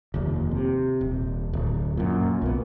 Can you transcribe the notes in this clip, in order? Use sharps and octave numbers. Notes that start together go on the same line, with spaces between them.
F1 D#2
C3
D#1
D1
F#2 A#2
B1 A#3 B3